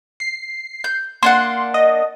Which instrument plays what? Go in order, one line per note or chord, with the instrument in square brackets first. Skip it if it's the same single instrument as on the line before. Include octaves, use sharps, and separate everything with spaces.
[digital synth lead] C7
[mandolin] G6
[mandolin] A#3 D4 F#5 [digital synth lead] C6
[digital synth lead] D#5